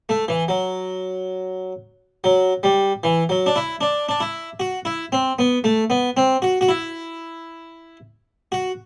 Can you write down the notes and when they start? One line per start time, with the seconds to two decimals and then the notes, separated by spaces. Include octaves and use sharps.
0.09 A3
0.28 E3
0.48 F#3
2.24 F#3
2.63 G3
3.03 E3
3.29 F#3
3.46 D4
3.56 E4
3.81 D4
4.09 D4
4.20 E4
4.60 F#4
4.85 E4
5.12 C4
5.39 B3
5.64 A3
5.90 B3
6.17 C4
6.42 F#4
6.61 F#4
6.68 E4
8.52 F#4